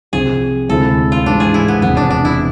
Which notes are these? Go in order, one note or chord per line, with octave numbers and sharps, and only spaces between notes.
C2 C3 F3 G#4
D2 C3 G#3 C4 E4 A4
F4
A1 G#2 E3 G#3 D4
G#4
E4
B3
E1 E2 C3 F3 B3
D4
D4
E4